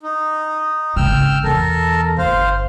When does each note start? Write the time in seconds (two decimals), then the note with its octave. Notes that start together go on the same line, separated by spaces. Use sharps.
0.03 D#4
0.96 G#1 C#3 G5 E6 F6
1.44 E2 B2 A4 A#4
2.18 G1 C5 F5